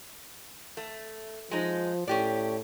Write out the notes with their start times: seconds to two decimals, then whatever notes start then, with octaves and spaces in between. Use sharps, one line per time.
0.77 A3
1.51 F3 G#3 D#4
2.08 A2 C#4 G4 D5